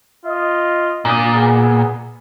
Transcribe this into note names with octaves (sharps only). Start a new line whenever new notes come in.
F4 D#5
A#2 D4 D#6
B3 G#4